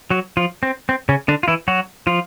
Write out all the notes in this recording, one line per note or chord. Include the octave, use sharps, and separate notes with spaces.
F#3 F#4
F3 F4
C4
C4
C#3 C#4
D3 D4
F4
E3 E4
F#3 F#4
F3 F4